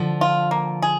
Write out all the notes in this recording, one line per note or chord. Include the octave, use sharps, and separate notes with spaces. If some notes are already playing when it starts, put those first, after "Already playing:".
Already playing: D3 F3
F4
A#3
G#4